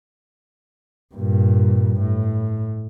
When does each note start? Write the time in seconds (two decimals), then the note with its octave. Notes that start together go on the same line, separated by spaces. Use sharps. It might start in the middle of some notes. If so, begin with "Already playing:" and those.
1.15 G2 A#2
1.99 A2